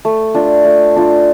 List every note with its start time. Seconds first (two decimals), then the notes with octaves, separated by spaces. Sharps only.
0.05 A3
0.35 D4 F4
0.65 A3
0.96 D4 F4